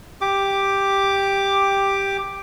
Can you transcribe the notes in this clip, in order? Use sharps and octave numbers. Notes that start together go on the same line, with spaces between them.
G4 D6